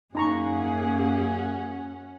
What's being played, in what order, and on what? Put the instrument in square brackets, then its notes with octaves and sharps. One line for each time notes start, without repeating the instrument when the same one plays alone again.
[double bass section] F#2 [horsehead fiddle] A#3 G#4 [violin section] C#4 F#5 [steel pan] D#4 A#5 C#6